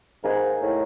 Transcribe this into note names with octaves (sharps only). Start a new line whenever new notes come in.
G#2 A#3 D#4 G#4 B4
A2